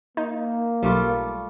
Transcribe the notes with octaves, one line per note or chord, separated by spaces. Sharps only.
A#3 D#4
B1 G3 A3 F4